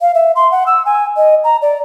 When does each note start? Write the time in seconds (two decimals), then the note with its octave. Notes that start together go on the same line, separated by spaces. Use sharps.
0.01 F5
0.15 E5
0.36 C6
0.51 F#5
0.67 E6
0.86 G#5
1.17 D#5
1.44 A#5
1.62 D5